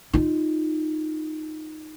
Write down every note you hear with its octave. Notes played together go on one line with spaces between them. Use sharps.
D#4 F4